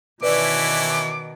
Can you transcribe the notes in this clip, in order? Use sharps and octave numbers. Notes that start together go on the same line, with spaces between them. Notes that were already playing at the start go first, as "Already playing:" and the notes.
B2 D#3 E3 C#4 E4 B4 D5 D6